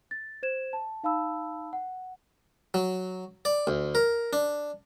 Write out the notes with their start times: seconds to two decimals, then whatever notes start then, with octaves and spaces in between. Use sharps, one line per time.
0.11 A6
0.43 C5 G#6 E7
0.73 A5
1.04 D#4 F5 A5 B5 E6
1.73 F#5
2.74 F#3
3.45 D5
3.67 D2
3.95 A#4
4.33 D4